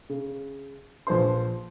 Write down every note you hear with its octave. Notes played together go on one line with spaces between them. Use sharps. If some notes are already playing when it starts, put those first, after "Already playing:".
C#3
A#1 F3 B4 C5 C6